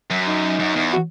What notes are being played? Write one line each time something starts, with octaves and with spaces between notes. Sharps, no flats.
F#2
D#4
F#2
E2
F#4